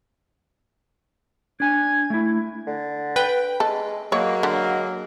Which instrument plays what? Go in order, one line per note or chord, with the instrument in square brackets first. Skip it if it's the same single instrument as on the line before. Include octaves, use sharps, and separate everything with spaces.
[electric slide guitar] D4 G#5 [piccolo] G#6
[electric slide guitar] A3 E4
[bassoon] D3
[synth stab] B4 G5
[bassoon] G#3 [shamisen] A4
[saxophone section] F#3 A#3 [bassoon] G#3 [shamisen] C#5
[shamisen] D3